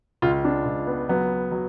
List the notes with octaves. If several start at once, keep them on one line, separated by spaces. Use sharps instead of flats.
C#2 F4
D4
C#2
B3
F#3 B3
F#3